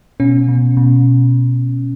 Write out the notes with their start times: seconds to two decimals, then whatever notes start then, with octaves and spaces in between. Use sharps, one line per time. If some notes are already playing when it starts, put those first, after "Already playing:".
0.20 B2 C#4
0.49 B2
0.77 B2